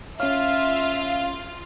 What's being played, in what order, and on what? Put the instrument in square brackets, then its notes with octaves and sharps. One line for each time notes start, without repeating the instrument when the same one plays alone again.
[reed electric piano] C#4 C#5 [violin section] F4 [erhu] E5 [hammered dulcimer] F5